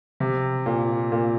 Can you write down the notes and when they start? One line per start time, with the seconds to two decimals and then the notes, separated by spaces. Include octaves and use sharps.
0.20 C3
0.66 A#2
1.12 A#2